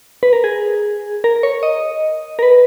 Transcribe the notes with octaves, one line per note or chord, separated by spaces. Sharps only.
B4
A#4
G#4
A#4
C#5
D#5
A#4
B4